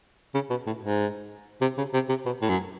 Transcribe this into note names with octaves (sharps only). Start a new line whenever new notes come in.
C#3
B2
A2
G#2
C3
C#3
C3
C3
B2
A2
F#2